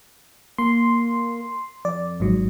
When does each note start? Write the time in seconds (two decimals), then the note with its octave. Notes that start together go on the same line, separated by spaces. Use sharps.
0.58 A#3 C6
1.85 F2 D5
2.20 G#1 G#2 F#3